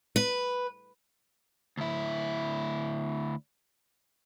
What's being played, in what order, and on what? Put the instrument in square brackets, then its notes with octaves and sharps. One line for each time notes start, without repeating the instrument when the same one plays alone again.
[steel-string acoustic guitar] B4
[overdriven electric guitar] D2 E4